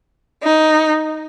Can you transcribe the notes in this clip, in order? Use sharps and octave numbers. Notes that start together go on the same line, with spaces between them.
D#4